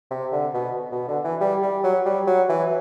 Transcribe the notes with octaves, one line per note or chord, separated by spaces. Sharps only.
C3
D3
B2
B2
D3
E3
G3
G3
F#3
G3
F#3
E3